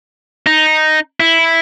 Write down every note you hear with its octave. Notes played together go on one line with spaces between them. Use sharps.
D#4
E4